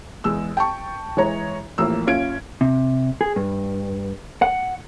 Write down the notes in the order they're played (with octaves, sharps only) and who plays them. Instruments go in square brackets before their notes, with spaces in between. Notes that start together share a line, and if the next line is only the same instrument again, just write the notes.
[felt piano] E2 G#3 E6
G5 A5 C#6
E3 G#3 C#5 A#5
A1 A2 F3 A#3 E4 E6
F#1 C#4 F4 F5 G#6 D7
[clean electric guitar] C3
G#4
G2
F#5